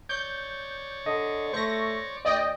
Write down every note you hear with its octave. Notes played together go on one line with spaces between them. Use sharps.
C#5 D5 G6
D3 D#5
A3 C5 C#6 A#6
D2 D5 D#5 G5